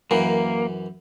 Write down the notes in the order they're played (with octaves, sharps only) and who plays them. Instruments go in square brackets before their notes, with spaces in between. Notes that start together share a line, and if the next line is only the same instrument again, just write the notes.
[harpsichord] F#2 E3 [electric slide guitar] A#3